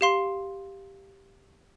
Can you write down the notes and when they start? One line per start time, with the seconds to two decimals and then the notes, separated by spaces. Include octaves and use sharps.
0.01 G4 F5 C6